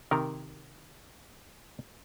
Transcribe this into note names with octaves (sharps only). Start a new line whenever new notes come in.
C3 D#3 A#4